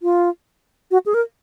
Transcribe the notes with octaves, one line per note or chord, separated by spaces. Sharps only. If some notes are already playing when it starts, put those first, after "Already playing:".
F4
F#4
G#4
A#4